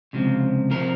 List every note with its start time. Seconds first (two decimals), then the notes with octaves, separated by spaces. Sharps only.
0.13 C#2 C3 F3
0.71 C3 F3 A#4